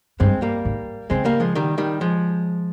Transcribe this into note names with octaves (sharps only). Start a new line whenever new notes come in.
G2 G#3 C4
G3 A#3
G#2
C#3 G#3 C4
G3 A#3
F3 G#3
D#3 G3
D#3 G3
F3 G#3